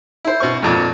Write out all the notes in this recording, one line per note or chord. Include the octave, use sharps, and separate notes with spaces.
E4 C5
B2 C4 C#6
G#1 F2 A#2